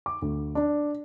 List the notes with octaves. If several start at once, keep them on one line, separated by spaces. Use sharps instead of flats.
D6
D2
D4